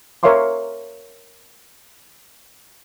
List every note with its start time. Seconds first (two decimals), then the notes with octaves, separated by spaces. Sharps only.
0.23 A#4 C#5 E5 F5 C6 D6